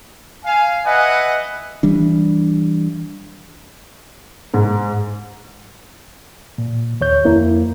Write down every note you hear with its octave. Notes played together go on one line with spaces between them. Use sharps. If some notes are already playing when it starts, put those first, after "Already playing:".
F5 G#5
B4 D#5 E5 F#5 G#5
E3 G3 D4
G#2
A#2
D#2 C#5 G6
F2 A#3 E4